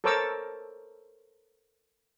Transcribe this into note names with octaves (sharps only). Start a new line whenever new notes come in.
A4 A#4 C5 C#5 D6 E6